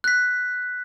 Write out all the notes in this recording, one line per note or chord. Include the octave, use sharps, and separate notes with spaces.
F#6 B6